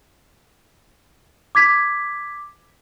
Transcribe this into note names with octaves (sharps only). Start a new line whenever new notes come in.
D6 G#6 B6